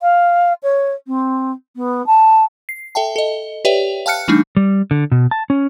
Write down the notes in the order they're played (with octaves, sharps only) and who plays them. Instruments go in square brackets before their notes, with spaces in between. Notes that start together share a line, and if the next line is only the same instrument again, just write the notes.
[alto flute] F5
C#5
C4
B3
A5
[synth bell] C7
A4 E5 G5 A5
A4 D#5
G4 B4 C#5 D5 E5 G5
F5 G5 A5 F6 F#6 C#7
E3 G3 A3 D4 D#4
[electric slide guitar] G3
D3
B2
A5
C#4